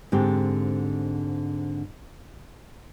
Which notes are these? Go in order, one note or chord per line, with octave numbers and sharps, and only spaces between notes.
G#2 D3 C4 G4